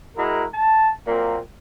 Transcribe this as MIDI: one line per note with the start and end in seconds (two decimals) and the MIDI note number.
0.16 0.45 56
0.16 0.45 64
0.16 0.45 66
0.16 0.45 70
0.54 0.89 81
1.07 1.39 46
1.07 1.39 54
1.07 1.39 58
1.07 1.39 60
1.07 1.39 70